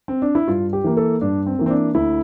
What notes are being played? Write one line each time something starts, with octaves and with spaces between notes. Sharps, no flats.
C4
D4
E4
G2 F4
G4
E3 A#3
A4
G2 D4
C4
E3 A#3
C4
D4
D2 E4